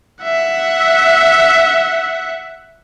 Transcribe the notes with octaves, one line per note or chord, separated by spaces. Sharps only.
E5 F#5